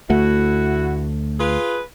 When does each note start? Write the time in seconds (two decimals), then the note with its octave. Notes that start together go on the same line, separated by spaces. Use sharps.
0.10 D2 A3 E4 F#4
1.40 F4 G#4 B4